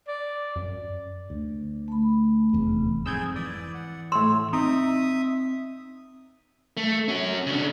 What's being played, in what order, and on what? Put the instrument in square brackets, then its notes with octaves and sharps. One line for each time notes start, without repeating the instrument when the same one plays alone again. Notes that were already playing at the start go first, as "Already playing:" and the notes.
[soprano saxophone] D5
[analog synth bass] F#2
[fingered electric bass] D2
[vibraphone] A3 B5
[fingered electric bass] F1 E2
[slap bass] F2 G#2 [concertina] G#4 [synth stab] E6 G6 G#6
[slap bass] E3 [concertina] D5
[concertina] F#5
[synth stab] A2 E6 [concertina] C#5 [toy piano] C6
[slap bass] C4 [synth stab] D#4 [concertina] E5 D#6
[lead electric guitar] A3
C#4 F#4
C#3 D4